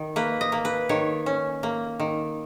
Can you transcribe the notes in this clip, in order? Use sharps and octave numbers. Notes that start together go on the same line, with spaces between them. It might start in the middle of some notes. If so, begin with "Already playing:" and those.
Already playing: D#3
A#3 B4
D#5
A#3
B4
D#3 C#5
C#4
A#3
D#3